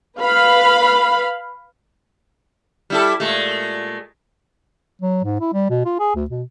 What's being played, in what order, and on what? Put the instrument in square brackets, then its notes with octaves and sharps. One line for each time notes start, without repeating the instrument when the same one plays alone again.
[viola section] B4 F5 B5
[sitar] G3 E4 A4
A#2 G#3 A3
[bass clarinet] F#3
G#2
E4
G3
B2
F4
G#4
D2
B2